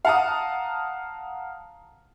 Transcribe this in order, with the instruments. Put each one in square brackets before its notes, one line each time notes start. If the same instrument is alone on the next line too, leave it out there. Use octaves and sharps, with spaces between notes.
[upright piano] F5 F#5 A5 A#5 D#6